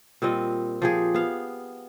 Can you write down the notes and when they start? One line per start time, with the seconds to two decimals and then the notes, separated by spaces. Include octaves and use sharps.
0.22 A#2 G3 C4 D#5
0.82 F3 G4 G#4
1.14 B3 F5